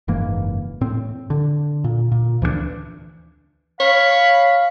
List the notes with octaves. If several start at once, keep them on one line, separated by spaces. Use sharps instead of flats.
F#1 G#2 E3 A#3
A2 C4
D3
A#2
A#2
D2 E3 G3 D4
C#5 F5 B5